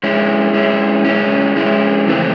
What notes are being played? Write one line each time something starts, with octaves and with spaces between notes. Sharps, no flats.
G#3 C#4 E4
G#3 C#4 E4
G#3 C#4 E4
G#3 C#4 E4
F2 C#3 E3 A3 C4